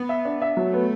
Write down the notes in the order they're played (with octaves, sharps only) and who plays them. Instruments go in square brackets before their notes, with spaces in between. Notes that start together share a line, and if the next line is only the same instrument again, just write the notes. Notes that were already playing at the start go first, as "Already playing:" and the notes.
Already playing: [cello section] B3
[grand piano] E5
D4
E5
[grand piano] F#3 [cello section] A3
[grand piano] B3